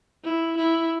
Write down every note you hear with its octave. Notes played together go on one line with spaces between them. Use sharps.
E4
E4